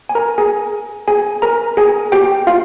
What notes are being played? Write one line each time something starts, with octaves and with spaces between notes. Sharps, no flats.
G#5
A#4 A#5
G#4 G#5
G#4 G#5
A#4 A#5
G#4 G#5
G4 G5
F4 F5